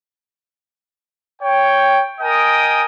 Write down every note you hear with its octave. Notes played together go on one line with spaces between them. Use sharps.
C#5 G5
A#4 D#5 G5 G#5 D#6